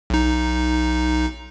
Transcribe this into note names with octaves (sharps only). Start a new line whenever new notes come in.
B1 D#4